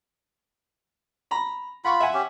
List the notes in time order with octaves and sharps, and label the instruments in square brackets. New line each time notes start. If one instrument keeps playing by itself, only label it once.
[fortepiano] A#5 B5
[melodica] F4 B5 [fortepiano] F#5 C#6
[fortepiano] E5 F#5 G#5
[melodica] C#4 G4